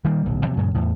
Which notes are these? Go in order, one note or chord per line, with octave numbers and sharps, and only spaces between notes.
D#3 G3 A#3
D1 B1
D#2 C3 F3 F#3
F#2 A#2 C#3
E2 A2